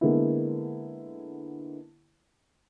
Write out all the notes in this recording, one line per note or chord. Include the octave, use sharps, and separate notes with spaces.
D3 G#3 A#3 B3 E4